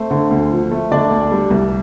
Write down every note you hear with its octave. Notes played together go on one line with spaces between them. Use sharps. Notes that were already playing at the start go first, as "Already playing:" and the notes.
Already playing: A3 C4 C5
D3
D2
F3
A3
D3 D4 D5
D2
G3
C2